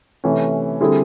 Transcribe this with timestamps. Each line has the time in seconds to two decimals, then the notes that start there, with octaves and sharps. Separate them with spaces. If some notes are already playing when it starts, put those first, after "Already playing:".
0.24 C3 E3 A3 C#4
0.81 D3 G3 C4 E4 G#4